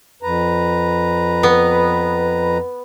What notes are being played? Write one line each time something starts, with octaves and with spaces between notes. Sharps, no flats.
F2 B4 A#5
B3